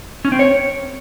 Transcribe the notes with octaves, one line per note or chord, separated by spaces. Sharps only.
C#4
C4
C#5